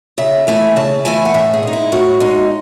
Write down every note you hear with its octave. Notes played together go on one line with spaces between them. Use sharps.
C#3 E5
E3 A3 E4 G#5
C#3 A5
E3 A3 E4 G#5
F#5
A2 E5
G#4
G#3 D#4
E4
A2 F#4
G#3 D#4